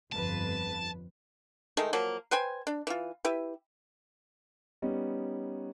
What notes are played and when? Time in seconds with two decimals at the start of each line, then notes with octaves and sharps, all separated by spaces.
0.12 G1 F2 B4 A5
1.77 D#3 G#3 A3 D#4
1.93 F3 F#3 A#3
2.31 B4 C5 G5 G#5
2.67 D4
2.87 E3 F4
3.25 E4 G4 B4
4.82 G3 B3 C#4 D#4